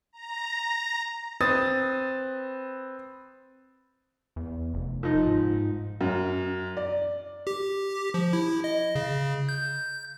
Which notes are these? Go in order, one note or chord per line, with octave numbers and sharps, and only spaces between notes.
A#5
C4 B4 D#6 A6
E2
F1
F3 D#4
G#2
F#2
D5
G4
F3
E4
D#5
C#3
G6